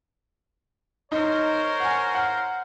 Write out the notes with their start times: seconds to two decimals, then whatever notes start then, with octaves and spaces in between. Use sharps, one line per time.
1.12 D#4 A#4 C5 C#5
1.80 F#5 G#5
2.15 F5 F#5